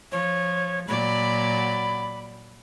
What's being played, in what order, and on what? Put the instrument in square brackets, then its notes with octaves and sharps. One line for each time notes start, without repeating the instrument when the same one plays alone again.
[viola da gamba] F3 [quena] C#5
[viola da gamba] A#2 F#3 D5 [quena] B5